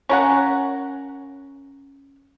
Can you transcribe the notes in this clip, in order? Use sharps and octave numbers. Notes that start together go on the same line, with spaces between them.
C#4 A#4 F#5